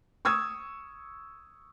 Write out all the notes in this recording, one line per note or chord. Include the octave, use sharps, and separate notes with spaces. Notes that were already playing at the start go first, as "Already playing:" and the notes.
C#6 D#6 E6 G#6